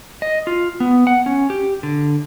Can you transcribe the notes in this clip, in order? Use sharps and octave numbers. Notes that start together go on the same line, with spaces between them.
D#5
F4
B3
F#5
C#4
G4
D3